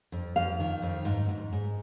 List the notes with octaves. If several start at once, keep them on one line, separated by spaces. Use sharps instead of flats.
F2
F2 F5
D#3
F2
G#2
G#2
G#2